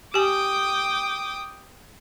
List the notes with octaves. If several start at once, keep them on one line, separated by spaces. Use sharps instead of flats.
G4 G5 G#5 D6 D#6